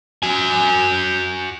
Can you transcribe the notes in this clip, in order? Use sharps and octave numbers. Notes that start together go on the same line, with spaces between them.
F#4 G#5